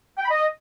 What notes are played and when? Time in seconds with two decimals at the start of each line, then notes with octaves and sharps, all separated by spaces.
0.18 G5
0.24 B5
0.30 D#5